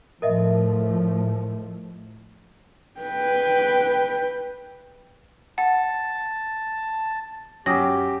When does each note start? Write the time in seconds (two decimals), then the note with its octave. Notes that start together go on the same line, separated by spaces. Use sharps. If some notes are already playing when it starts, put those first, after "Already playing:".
0.22 A2 F3 A3 A#4 D#5 E5
3.01 B4 G5
5.58 F#5 A5
7.66 F#2 G4 D#6 A#6